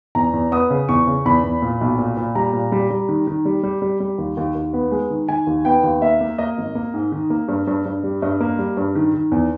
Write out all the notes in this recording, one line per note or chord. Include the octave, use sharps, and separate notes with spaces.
E2 A#5
E2
B3 D#6
C#3
E2 C#6
C#3
E2 B5
E2
A#2
B1
A#2
A#2
G3 A#5
A#2
G3
G3
D#3
D#3
G3
G3
G3
G3
D#2
D#2
D#2
B3
G#3
D#3
D#3 G#5
D#2
B3 G5
D#2
A#3 E5
A#3
A#3 D#5
G#1
A#3
G#2
D#3
A#3
G2
G2
G2
G3
G2 D#5
A#3
G3
G2
D#3
D#3
E2